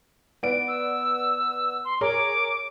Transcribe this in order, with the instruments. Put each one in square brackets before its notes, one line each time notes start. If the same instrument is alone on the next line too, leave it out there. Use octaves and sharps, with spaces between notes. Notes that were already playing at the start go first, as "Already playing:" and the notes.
[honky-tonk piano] B3 D5 D7
[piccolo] E6
C6
[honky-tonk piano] G#4 A#4 C#5 [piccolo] D6